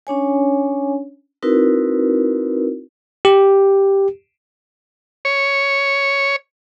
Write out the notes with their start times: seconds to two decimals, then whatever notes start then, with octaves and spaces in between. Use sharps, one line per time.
0.07 C#4 D4 C#5 G#5
1.43 C4 D#4 E4 F#4 A#4 B4
3.25 G4
5.25 C#5